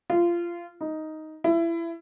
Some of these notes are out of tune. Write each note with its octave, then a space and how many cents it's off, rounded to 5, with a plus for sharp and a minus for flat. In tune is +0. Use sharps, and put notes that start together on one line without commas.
F4 -20
D#4 +5
E4 +25